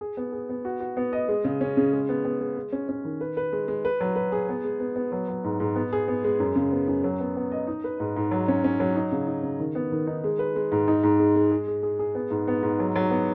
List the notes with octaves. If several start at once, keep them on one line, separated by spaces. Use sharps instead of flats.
G#4
B3
G#4
B3
F#4
F#4
B3
D#5
G#3
C#3
C#4
C#3
G#3
B3
B3
G#3
G#3
C#4
C#4
D#3
B4
B4
G#3
G#3
B4
F#3
B4
G#4
B3
G#3
B3
B3
F#3
F#3
G#2
G#2
B3
G#4
B3
G#3
F#2
C#3
B3
F#2
F#3
B3
B3
D#5
D#4
B4
G#2
G#2
F#3
C#4
C#4
F#3
D#4
C#3
D#4
C#3
D#3
B3
D#3
D#4
G#3
B4
G#3
G#2
D#4
G#2
G#3
G#3
G#4
G#4
G#4
G#4
B3
G#2
B3
G#2
F#3
F#3
B3